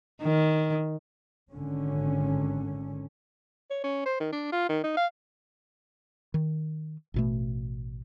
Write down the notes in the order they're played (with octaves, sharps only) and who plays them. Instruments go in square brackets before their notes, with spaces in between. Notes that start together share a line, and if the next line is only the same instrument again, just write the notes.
[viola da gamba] D#3
[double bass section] G#1 D3 C#4
[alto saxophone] C#5
C#4
C5
D#3
D4
F4
D#3
D#4
F5
[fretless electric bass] D#3
A1 B2 A3